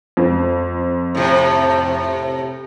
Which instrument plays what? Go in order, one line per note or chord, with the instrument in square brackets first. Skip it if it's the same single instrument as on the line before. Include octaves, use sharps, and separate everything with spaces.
[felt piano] F2
[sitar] A2 C3